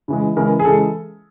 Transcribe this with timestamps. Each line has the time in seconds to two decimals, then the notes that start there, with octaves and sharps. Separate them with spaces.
0.08 C#3 E3 G#3
0.36 C#3 E3 G#3 A#4
0.59 G#4
0.65 C#3 E3 G#3 A4